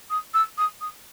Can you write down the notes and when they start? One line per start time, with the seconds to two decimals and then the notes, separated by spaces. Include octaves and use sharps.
0.10 D#6
0.34 E6
0.58 D#6
0.81 D#6